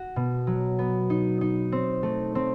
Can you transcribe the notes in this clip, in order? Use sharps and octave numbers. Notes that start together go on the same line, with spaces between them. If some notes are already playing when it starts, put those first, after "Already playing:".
Already playing: F#4
B2
F#3
B3
D#4
D#4
C4
A3
C4